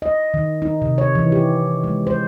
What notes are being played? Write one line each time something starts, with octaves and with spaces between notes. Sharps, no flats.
D#5
D#3
D#4
C3
C#5
E3
G4
G#3
C5